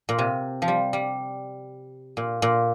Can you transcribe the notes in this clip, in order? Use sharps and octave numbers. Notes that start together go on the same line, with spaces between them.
A#2
C3
F3
G3
G3
A#2
A#2